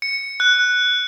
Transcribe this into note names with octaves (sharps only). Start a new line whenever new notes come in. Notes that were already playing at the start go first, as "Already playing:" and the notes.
C#7
F#6